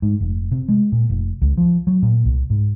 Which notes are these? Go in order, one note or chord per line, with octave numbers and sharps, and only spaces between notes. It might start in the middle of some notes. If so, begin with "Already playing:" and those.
G#2
F1
C3
G#3
A#2
F1
C#2
F3
F#3
A#2
C2
G#2